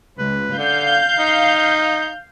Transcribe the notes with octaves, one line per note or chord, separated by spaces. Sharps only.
C#2 B4
D3 F5 G6
D#4